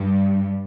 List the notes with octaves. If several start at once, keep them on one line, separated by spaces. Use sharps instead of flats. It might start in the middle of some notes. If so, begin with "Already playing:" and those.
Already playing: G2 G3